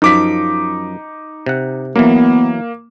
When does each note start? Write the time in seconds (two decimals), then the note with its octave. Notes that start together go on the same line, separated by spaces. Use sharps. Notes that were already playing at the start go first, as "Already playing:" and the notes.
0.02 F#2 F3 D#4 D6 B6
1.46 C3 F#5
1.96 E3 F#3 A#3 B3